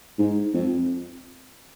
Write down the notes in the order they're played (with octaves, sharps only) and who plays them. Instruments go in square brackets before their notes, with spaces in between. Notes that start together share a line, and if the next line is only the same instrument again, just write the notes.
[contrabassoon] G#2
F2